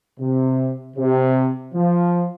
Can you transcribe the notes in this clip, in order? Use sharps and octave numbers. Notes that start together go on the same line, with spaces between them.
C3
C3
F3